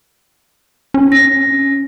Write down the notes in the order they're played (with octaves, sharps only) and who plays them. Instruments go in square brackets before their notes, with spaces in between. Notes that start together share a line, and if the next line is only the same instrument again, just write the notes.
[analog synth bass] C#4
[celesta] A#6